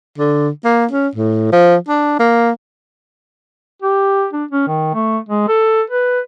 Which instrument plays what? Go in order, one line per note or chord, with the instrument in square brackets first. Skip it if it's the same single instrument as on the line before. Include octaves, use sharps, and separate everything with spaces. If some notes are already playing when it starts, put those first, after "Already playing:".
[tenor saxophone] D3
A#3
C#4
A2
F3
D4
A#3
[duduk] G4
D4
C#4
D#3
A3
G#3
A4
B4